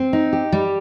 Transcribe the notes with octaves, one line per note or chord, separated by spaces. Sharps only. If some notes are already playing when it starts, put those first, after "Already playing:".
Already playing: C4
D#4
G4
G3